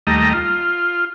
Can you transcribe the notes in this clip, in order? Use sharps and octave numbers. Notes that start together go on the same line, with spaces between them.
D#2 G3 A3 D#5 A#5
F4